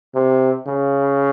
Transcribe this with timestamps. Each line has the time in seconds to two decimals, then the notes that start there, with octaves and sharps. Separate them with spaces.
0.15 C3
0.67 C#3